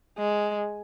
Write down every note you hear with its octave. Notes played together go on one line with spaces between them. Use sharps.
G#3